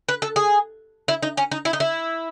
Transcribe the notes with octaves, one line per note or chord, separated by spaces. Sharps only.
B4
A4
G#4
E4
D#4
C#4
D#4
E4
D#4
E4